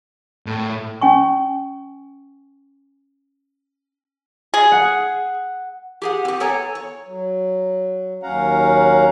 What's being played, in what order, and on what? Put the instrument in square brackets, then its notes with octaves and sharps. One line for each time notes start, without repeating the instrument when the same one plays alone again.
[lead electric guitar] A2
[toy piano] C#4 G#5 C#6
[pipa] G#4
[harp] F#5
[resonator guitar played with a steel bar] G4 G#4 F#5
C4 G4
B3 A4 C#5 G#5 A#5
C#5
[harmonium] F#3
D#2 F#3 C#4 F5 F#5 A#5